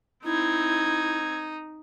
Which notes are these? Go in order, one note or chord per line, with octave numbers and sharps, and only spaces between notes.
C4 D#4 E4 G#6